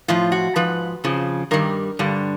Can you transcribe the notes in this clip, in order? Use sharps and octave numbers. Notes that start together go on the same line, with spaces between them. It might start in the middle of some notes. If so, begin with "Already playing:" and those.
A2 F3 F4
F#4
G#2 F3 B4
F2 C#3 F3
G2 D#3 G3 A#4
G2 D3 G3